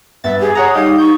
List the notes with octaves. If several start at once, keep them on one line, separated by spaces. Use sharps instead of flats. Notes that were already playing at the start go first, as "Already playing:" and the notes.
G2 B3 E5 A6
G4 G#4
C#5 F#5 A#5 D#6
G3 D#4 G4 D#5 F5
C#6 G6